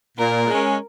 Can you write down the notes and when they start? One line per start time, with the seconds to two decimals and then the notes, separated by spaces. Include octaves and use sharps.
0.18 A#2 A#4
0.47 G#3 C#4